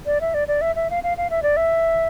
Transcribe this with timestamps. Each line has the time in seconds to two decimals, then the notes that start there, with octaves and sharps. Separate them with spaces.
0.06 D5
0.21 E5
0.34 D5
0.48 D5
0.61 E5
0.76 E5
0.90 F5
1.04 F5
1.17 F5
1.30 E5
1.43 D5
1.57 E5